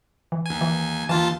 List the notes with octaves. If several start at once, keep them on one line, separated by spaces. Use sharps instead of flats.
E3
D#2 G#5
E3
D#2 E3 F4 A5